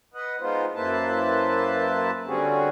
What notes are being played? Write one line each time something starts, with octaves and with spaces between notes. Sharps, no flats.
B4 D#5 F#5
G#3 B3 D#4 F4 C5
F#2 A#3 E4 B4 C5 A5
D3 G3 C4 C#4 F#4 G#4